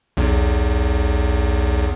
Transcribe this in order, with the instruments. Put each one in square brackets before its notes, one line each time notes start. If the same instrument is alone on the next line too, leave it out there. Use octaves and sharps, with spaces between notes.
[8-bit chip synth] B1 E2